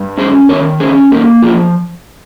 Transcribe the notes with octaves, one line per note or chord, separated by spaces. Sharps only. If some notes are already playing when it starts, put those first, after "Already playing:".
Already playing: G2
C#4 G#4 C5
D#3 A#4 C#5
C#4 G#4 C5
A#3 G4 A#4
F3 F4 G#4